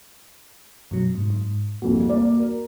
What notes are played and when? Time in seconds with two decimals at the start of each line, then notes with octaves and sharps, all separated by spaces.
0.91 F#2 B2 F#3
1.15 G#2
1.30 G#2
1.82 C2 F2 A#2 F#4
2.08 A#3 D5
2.39 A#4